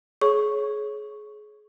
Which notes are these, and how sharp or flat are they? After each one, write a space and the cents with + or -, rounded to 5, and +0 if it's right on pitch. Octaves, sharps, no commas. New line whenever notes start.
G#4 +30 C#5 -10 C#6 +0